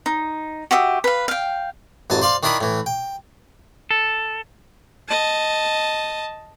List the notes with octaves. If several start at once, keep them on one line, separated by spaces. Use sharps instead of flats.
D#4
F#4 G4 E5 D#6
B4 F5
F5 G5
A1 F#2 G#5 A5
C5 D5 F5 C6
D#3 D4 E4 A#4 D#5 B5
A2 E3
G5
A4
D#5 A5